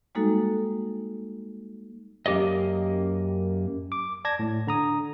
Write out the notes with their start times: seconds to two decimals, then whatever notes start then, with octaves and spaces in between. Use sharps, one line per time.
0.15 G3 G#3 A#3 D#4 F#4 A4
2.26 F#2 A#3 G4 D5 D#5
3.92 D6
4.25 D5 A5 G#6 A#6
4.39 A2
4.67 D3 A#5 D#6